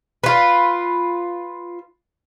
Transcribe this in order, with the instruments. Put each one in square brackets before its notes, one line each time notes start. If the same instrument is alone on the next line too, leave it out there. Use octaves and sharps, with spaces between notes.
[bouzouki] F4 B4